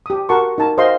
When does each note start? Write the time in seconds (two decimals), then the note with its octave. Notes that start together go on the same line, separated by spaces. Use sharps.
0.06 G4 D#6
0.29 F#4 A#4 F#5 A5 C6 C#6
0.58 D#4 A#4 A5
0.77 F#4 C5 D#5 F5 G5 C6